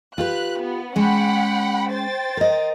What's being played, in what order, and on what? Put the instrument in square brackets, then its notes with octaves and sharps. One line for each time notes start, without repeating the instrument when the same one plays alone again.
[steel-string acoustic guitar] F4 G4 B4 [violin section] F#6
[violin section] B3
[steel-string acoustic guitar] G#3 C#4 [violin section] F#5 G5 B5
[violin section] C5 G5 A6
[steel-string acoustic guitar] A#4 D#5